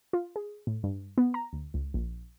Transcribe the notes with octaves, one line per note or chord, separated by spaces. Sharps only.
F4
G#4
A2
G2
B3
A#5
D2
C#2
A#1